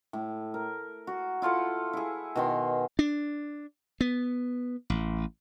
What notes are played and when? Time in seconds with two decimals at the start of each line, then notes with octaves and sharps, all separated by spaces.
0.13 A2
0.54 A#4
1.07 F#4
1.42 E4 F4 A4 F#5
1.93 E4 G#4
2.36 B2 D#3 C6
2.99 D4
4.01 B3
4.90 A1